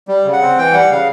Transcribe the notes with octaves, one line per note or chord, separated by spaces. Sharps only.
G3
C#3
F#5
C4
E3 G5
G3 F#5
C#3 F5